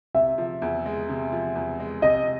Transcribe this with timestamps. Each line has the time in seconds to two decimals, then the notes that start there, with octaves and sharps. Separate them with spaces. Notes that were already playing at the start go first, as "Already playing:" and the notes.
0.15 C3 E5
0.38 F3
0.62 E2
0.86 G#3
1.09 C3
1.32 F3
1.55 E2
1.80 G#3
2.02 C3 D#5